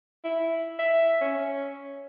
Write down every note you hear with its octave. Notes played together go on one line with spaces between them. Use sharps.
E4
E5
C#4